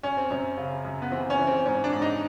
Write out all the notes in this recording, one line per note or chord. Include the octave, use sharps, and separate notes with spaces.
F#2 C#4
C4
F#2 C#4
C#3
F#2
B3
E3 C4
C#4
E3
C4
G#2 C#4
D4
G#2
D#4